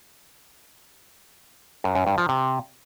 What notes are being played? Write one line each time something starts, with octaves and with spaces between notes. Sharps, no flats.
F#2
F#2
G2
F3
C3